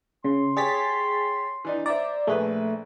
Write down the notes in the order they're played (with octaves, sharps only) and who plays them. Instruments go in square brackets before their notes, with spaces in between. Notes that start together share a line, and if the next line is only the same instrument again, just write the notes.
[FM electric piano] C#3 [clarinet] C6
[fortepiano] G4 C#5 [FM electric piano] G#4 A6 B6
[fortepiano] E3 D4 D#4
[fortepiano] C5 E5 A#5 [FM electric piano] D5
[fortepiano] A#1 G#4 B4 [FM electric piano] A3